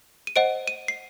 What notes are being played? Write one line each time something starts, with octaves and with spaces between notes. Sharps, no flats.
D#7
C5 D#5 F#5 D7
D#7
C7